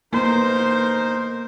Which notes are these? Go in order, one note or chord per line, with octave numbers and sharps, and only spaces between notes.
A#3 B3 D#4 A#4 C5